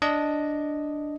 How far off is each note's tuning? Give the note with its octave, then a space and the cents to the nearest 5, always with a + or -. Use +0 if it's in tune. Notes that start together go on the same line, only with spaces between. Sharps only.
D4 +0 D#5 +0